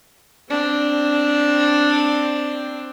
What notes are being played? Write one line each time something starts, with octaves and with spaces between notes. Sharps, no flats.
C4 D4